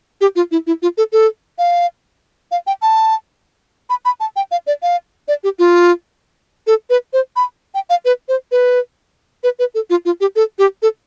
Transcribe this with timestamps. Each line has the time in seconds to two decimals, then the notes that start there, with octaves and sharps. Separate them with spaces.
0.21 G4
0.36 F4
0.51 E4
0.67 E4
0.82 F4
0.98 A4
1.13 A4
1.58 F5
2.51 F5
2.67 G5
2.82 A5
3.90 B5
4.05 B5
4.20 A5
4.36 G5
4.51 F5
4.67 D5
4.82 F5
5.28 D5
5.44 G4
5.59 F4
6.67 A4
6.90 B4
7.13 C5
7.36 B5
7.74 G5
7.90 F5
8.05 B4
8.28 C5
8.52 B4
9.44 B4
9.59 B4
9.75 A4
9.90 F4
10.05 F4
10.21 G4
10.36 A4
10.59 G4
10.82 A4